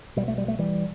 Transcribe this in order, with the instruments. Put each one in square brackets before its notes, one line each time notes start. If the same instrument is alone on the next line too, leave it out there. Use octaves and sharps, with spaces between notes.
[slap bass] B1 B2 G3
A3
G3
A3
E3 G3